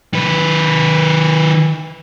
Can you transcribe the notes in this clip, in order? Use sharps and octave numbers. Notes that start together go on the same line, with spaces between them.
D#3 B4